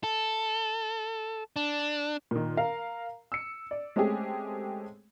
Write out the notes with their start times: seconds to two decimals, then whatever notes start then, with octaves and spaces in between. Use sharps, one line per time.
0.04 A4
1.56 D4
2.31 A#2 D#3
2.57 A#4 F5 A#5
3.32 E6 C#7
3.71 D5
3.96 G#3 A3 C4 C#4 G4 G#4